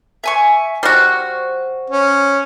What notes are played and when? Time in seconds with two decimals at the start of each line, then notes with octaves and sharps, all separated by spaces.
0.24 E5 G#5 C#6
0.83 G3 F#4 C5 F6
1.90 C#4